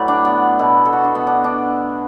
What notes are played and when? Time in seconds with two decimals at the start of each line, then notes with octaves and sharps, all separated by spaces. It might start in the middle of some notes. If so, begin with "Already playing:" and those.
Already playing: A2 F#3 A3 B4 D5
0.08 D4
0.25 B3
0.59 B2 A3 E4
0.85 A4
0.93 F#4
1.04 D4
1.15 B3
1.27 D4
1.44 D4